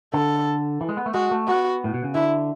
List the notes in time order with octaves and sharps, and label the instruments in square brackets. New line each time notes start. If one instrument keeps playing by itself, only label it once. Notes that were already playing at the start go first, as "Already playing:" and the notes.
[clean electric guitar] D3 [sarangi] A4
[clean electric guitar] E3
G#3
B3
A3
[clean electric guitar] G#3 [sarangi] F#4
[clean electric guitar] A3
[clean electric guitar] B3 [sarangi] F#4
[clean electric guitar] A2
B2
C#3
[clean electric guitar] D3 [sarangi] E4